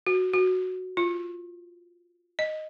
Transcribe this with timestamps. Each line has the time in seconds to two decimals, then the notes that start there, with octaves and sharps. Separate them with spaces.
0.07 F#4
0.33 F#4
0.97 F4
2.39 D#5